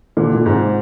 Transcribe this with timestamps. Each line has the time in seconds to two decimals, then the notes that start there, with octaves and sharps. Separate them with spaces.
0.17 A#2 D3
0.34 A#2
0.45 G#2 C3